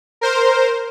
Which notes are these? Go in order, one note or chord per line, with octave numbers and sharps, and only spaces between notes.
A#4 C5